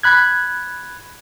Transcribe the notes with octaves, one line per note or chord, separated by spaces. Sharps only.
B5 F#6 G#6